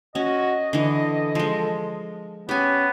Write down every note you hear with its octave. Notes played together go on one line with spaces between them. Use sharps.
C#4 F#4 D#5
D3 E3 A4
F3 G#3
B3 C#4 G4 G#5